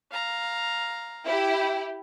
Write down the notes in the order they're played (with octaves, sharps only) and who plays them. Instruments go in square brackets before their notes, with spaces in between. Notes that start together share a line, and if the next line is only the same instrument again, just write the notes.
[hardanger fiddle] F5 A#5
[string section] E4 G4